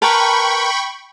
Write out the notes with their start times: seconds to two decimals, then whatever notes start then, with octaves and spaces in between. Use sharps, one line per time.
0.02 A#4 B4 G5 A5 B5 C#6